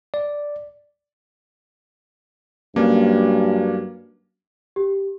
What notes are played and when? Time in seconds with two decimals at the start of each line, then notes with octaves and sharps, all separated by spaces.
0.14 D5
2.76 G2 F#3 A#3 C#4 D4
4.76 G4